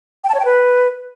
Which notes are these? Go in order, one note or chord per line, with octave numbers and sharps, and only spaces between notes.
G5
A5
C#5
G5
B4